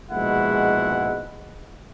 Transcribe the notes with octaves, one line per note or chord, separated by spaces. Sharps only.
A#1 G#2 B2 G#3 E4 F#5